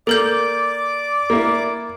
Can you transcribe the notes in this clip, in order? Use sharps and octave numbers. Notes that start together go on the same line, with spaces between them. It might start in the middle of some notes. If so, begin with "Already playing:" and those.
A#3 A4 A#4 D5 D6 G6
A#3 E4